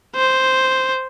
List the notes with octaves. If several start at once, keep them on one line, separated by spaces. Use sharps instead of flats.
C5